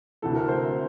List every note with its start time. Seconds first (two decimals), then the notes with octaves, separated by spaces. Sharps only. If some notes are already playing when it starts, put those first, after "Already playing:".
0.22 D2 C3 E3 A4
0.35 A#4
0.48 C5